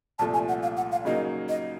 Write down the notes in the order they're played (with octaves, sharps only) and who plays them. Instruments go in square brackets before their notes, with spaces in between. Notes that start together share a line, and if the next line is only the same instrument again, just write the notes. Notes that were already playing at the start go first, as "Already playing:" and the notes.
[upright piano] C2 A#2 F3 A3 [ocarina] A5
[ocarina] G#5
F#5
F5
F#5
F5
[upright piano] C#3 F#3 A#3 D#4 [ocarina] D#5
[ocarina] D#5